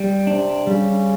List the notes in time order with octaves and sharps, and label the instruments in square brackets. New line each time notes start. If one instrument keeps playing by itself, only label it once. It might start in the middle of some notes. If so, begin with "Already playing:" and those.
Already playing: [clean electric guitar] G3
[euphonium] C3 [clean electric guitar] D4
[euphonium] C#3 [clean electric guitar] G3